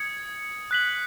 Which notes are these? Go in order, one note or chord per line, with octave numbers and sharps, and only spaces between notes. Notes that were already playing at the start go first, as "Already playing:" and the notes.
Already playing: D#6 G#6 C#7
F#6 B6 F#7